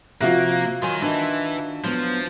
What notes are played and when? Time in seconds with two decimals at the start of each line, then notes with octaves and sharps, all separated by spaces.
0.21 C3 F3 A#3 F4 F#4 E5 F#6
0.82 D#3 F#3 G#5 C6
1.02 D#3 E3 D4 D#4
1.84 F3 F#3 B3